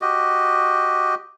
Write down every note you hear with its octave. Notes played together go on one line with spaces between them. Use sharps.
F#4 G4 D#5